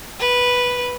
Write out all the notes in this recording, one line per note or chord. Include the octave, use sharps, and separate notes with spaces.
B4